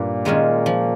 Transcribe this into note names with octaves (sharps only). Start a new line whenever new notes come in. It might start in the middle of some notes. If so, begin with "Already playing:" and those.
Already playing: G2 A#2
D#3 G#3 C#4 F4
F3